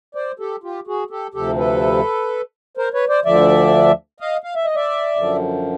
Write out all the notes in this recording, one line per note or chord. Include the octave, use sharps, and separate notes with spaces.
C5 D5
G4 A4
F4 G4
F#4 G#4
G4 A4
D2 C3 F3 G4 A4
A4 B4
A#4 C5
B4 C#5
C5 D5
D2 D3 F3 D5 E5
D#5 F5
F5
E5
D#5
D5 E5
F#2 D3 F3